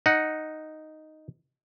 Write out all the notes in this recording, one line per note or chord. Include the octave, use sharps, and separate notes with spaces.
D#4 F#5